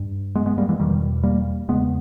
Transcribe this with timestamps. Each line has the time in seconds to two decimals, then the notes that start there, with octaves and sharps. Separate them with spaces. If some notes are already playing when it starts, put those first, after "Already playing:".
Already playing: G2
0.35 G#3 B3
0.46 G#3 B3
0.58 G3 A#3
0.69 E3 G#3
0.80 E2 B2 D#3 G3
1.23 G3 A#3
1.68 E2 C#3 G#3 B3